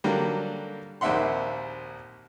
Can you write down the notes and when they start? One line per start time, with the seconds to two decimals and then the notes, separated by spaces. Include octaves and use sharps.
0.04 D3 F#3 G3 A#3
1.01 A#1 D#2 C4 E5 F#5 C6